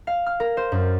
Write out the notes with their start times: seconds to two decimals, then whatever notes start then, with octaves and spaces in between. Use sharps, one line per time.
0.07 F5
0.26 F6
0.40 A#4
0.57 C5
0.72 F#2